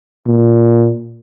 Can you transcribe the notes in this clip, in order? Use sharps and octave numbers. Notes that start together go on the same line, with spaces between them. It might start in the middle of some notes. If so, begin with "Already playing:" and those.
A#2